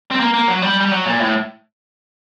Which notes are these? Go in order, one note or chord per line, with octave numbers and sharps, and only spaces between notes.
C4
A#3
A#3
F#3
G3
G3
F#3
A#2
A2